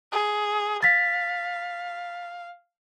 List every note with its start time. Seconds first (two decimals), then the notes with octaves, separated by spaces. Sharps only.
0.12 G#4
0.83 F5 A6 B6